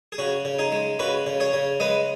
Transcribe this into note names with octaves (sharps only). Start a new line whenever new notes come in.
G#4
C#3 F#4
C#3
D#4 G#4
G#3
C#3 F#4 B4
C#3
G#4 C#5
C#3
G#3 B4 D#5